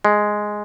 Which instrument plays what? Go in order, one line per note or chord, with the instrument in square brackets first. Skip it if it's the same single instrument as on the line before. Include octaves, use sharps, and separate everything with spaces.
[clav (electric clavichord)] G#3